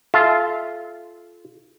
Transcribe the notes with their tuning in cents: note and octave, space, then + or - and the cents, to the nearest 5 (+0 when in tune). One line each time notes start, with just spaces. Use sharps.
F4 -10 A4 -30 E5 +0